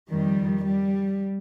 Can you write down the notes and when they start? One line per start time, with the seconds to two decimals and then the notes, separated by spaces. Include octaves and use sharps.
0.10 F2 D#3 G3
0.64 G3